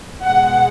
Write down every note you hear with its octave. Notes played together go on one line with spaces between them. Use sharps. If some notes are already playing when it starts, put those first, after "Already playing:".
B2 G#3 F#5